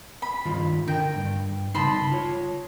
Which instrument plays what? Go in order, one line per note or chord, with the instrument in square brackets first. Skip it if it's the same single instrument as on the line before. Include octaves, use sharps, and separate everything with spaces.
[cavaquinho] B5
[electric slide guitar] G2 D#3 F4
[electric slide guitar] D3 A#4 [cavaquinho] G5
[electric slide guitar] G2
[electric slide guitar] C#3 G3 D#4 [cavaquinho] A5 B5 C6
[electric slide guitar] F4 C#5